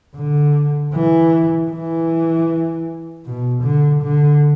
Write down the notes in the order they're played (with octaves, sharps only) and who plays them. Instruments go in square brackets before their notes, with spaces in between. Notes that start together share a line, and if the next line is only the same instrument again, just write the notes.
[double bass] D3
E3
E3
B2
D3
D3